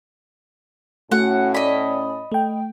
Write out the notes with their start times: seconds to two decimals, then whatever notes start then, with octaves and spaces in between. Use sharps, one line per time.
1.12 A2 A3 C#4 F#4 F#5
1.54 D5 D#5 B5
2.32 A3 G5